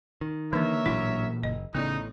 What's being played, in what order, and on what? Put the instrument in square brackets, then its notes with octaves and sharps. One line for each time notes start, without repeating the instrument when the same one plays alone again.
[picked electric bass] D#3
[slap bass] D3 A#3 [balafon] E3 D4 [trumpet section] A#4 C#5 E5
[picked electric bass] A1 F#3 D4 [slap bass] A#2 E3 [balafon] E4
[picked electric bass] F#1 [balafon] D#5
[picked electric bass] A1 A2 [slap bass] C#3 [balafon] B3 D5 [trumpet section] D#4